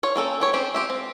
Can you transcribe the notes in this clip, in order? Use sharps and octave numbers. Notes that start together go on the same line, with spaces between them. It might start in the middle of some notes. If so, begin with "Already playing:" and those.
F4 C#5
A#3 C#4 A4 G5
B3 G4 C#5
C4 C#4 G4 C5
F4 G4 E5
C4